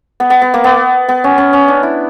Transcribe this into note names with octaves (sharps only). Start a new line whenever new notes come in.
B3
B3
B3
A#3
B3
B3
C#4
C#4
C#4
D4
E4